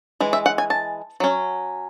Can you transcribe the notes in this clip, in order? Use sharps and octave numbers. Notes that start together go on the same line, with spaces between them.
E3 G#3
E5
F#5
G#5
A5
F#3 C#4